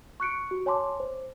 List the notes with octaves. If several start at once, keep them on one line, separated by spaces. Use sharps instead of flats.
C#6 F#6 C#7 D7
F#4
C#5 G#5 A5 C6 D6
C5